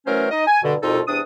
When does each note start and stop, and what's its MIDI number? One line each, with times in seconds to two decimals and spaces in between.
0.06 0.26 52
0.06 0.26 54
0.06 0.26 57
0.06 0.26 61
0.06 0.26 70
0.06 0.26 72
0.31 0.44 63
0.31 0.44 75
0.47 0.63 80
0.63 0.75 43
0.63 0.75 47
0.63 0.75 50
0.83 1.00 36
0.83 1.00 41
0.83 1.00 47
0.83 1.00 63
0.83 1.00 65
0.83 1.00 69
1.07 1.20 40
1.07 1.20 48
1.07 1.20 62
1.07 1.20 87